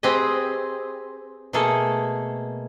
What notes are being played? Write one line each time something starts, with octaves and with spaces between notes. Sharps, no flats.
C4 G4 G#4 B4 D#5
B2 A3 A#3 G#4 A4